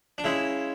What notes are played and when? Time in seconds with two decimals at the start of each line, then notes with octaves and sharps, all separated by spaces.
0.18 D4
0.24 C#3 G#3 E4